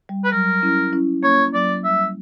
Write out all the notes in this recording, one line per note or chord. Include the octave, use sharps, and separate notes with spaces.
G3
B4
F#3 A#4
C#4 E4
C#4 E4
A#3 C#4 C#5
F#3 A#3 D5
G3 E5